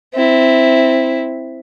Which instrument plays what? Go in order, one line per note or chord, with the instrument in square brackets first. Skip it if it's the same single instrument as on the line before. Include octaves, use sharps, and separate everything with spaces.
[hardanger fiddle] C4 E4